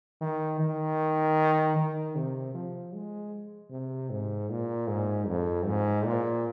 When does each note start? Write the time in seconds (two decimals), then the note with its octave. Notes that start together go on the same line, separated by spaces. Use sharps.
0.21 D#3
0.60 D#3
1.76 D#3
2.16 C3
2.54 F3
2.93 G#3
3.71 C3
4.10 G#2
4.50 A#2
4.88 G#2
5.28 F2
5.66 G#2
6.05 A#2